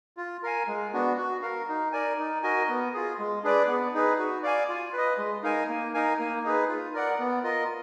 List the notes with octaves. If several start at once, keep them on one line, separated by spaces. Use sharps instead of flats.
F4
A#4 F5 G#5
G#3
B3 D4 F#4
F#4
A#4 F5
D#4
A#4 D5 G#5
D#4
F#4 A#4 D#5 G#5
B3
F4 G#4
G#3
D4 G#4 B4 D5
B3
D#4 G#4 B4
F#4
D5 F5 G#5
F4
B4 D#5
G#3
D#4 A#4 F5 G#5
A#3
D#4 A#4 F5 G#5
A#3
D#4 G#4 B4
F4
A#4 D5 F#5
B3
F4 A#4 D#5